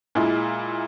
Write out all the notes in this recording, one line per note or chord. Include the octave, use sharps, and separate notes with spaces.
A#2 G#3 E4 F4